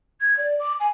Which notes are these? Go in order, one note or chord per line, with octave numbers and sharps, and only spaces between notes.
G#6
D5
D6
G#5